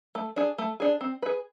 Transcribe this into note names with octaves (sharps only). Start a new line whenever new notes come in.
A3
D4 G#4
A3
D4 G#4
C4
G#4 B4